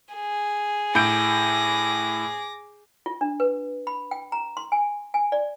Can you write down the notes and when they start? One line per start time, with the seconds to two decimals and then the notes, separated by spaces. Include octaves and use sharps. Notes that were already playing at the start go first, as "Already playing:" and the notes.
0.15 G#4
0.95 A2 D6 G6 A#6 D7
3.06 F4
3.21 D4
3.40 B4
3.87 B5
4.11 G5
4.32 A#5
4.57 C6
4.72 G#5
5.14 G#5
5.32 D5